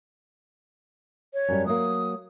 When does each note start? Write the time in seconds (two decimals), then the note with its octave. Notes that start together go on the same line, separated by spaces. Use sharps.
1.34 C#5
1.49 F#2 G3
1.66 F#3 A#3 D#6